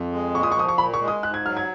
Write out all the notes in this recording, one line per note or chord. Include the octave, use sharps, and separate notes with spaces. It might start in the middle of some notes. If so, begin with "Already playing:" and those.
Already playing: F2
G#3
A#2 C#6
D#6
C#6
F3 D#6
C#6
A#2 B5
C#6
G#3
D#6
G#2 F#6
G#6
F#3 F6
G#6